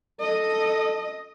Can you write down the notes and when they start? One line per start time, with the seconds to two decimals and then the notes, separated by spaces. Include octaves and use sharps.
0.20 A4 D#5